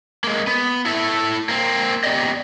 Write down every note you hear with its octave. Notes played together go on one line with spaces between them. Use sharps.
G#3 A#3
B3
E4 A4 E5
A#3 C4
B3 G4 D5 D#5